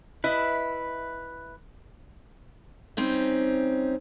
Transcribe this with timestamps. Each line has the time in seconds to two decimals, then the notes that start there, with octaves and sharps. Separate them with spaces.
0.24 E4 B4 D#5 E5
2.97 G3 C4 C#4 D#4